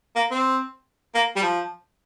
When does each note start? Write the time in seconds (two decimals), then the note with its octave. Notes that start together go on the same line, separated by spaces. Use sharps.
0.16 A#3
0.31 C4
1.15 A#3
1.36 G3
1.43 F3